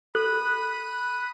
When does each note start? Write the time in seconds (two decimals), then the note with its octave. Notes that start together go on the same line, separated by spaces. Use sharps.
0.15 A4 B5 D#6 F#6